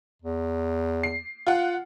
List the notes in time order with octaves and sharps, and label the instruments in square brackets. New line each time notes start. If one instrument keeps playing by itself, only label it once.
[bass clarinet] E2
[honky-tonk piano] C7
F4 F#5